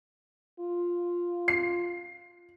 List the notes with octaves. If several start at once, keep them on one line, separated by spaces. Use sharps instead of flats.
F4
C7